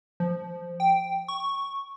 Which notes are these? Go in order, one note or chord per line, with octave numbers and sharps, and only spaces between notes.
F3
G5
C#6